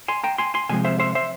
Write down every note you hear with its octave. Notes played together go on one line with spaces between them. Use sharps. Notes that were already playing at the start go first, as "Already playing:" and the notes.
G#5 C6
G5 A#5
G#5 C6
G#5 C6
C3 F3 G#3 C4 G#5
C5 E5
C5 E5
C5 E5